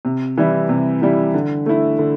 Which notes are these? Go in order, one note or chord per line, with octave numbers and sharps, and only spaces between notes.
C3
E3 G3 E4
C3
E3 G3 E4
D3
A3 E4
D3